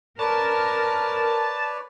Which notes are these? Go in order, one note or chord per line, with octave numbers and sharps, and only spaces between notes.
A#4 B4 C#5 D5 A5